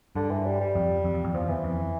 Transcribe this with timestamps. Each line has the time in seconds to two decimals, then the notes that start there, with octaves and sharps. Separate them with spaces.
0.15 G2 D3
0.31 E3
0.46 G3
0.61 G3
0.75 F2
1.04 F2
1.14 F2
1.24 F2
1.34 E2 F3
1.49 E2 E3
1.64 F2